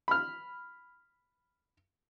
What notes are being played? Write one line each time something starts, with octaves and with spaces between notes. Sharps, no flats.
B5 F6